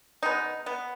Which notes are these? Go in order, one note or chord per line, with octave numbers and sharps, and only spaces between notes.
B2 G#3 B3 D#4
B3